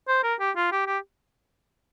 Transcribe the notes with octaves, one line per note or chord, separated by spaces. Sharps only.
C5
A#4
G4
F4
G4
G4